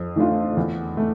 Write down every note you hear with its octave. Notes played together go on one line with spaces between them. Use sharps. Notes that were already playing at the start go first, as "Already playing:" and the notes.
Already playing: F2
E3 A3 D4 F4
E2
A3